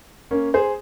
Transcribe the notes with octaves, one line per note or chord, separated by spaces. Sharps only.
A#3 C#4
G#4 C5